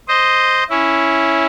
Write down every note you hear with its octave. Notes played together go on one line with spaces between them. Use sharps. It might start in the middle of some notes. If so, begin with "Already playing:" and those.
C5 D#5
C#4 E4